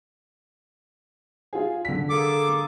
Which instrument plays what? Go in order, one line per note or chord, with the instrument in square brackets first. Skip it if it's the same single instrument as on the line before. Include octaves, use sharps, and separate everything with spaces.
[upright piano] F4 G#4
D3 B6
[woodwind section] A#3 G#4 A4 [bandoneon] D6